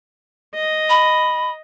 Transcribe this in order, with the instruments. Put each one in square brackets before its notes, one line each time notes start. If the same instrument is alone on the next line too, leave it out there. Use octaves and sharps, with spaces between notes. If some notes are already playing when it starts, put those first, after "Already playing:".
[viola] D#5
[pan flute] B5